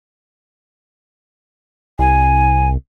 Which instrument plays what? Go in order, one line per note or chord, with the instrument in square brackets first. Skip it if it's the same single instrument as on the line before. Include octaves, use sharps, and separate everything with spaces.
[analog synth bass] C2 [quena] G#5